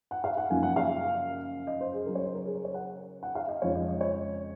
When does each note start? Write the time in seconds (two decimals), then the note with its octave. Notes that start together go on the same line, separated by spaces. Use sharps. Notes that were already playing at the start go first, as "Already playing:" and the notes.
0.11 F#5
0.24 F5
0.37 F#5
0.50 F#2 C#3 F3 A#3 D#4 G#5
0.63 F#5
0.76 F5
1.67 D#5
1.81 C5
1.93 G#4
2.06 C#3 F#3 C#4 A#4
2.15 C#5
2.26 C5
2.35 A#4
2.45 G#4
2.55 A#4
2.65 C#5
2.74 F#5
3.23 F#5
3.35 F5
3.48 D#5
3.62 F2 C#3 F3 G#3 C#5
3.75 D#5
3.88 D#5
4.01 C#5